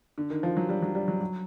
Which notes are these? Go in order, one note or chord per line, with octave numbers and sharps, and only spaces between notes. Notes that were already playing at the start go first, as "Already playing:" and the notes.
D3
D#3
F3
F#3
G3
F#3
G3
F#3
F#3